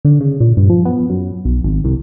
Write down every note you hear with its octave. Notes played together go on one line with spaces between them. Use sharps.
D3
C#3
A#2
G2
F3
B3
F#2
B1
G#1
C2